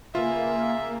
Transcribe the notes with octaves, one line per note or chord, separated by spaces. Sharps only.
C#3 A#3 F4 G#4 B4 E5